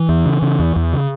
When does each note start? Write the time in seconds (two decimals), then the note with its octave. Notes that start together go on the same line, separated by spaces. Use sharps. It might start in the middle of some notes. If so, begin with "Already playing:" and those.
Already playing: E3
0.09 E2
0.25 C#3
0.42 C#3
0.59 E2
0.76 E2
0.93 C#3